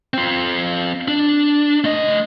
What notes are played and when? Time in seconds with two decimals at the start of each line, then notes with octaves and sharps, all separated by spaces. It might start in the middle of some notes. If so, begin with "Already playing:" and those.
0.14 C4 F4
1.08 D4
1.84 A3 D#5